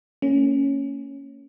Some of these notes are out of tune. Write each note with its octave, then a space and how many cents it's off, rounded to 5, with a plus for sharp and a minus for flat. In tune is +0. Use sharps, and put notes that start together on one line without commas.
A#3 -30 C#4 +0